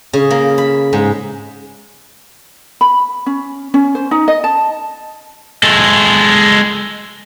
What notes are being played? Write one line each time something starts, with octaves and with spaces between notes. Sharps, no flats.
C#3
A#3
B5
G#2
B5
C#4
C#4
C5
D#4
D#5
A5
G#3 A4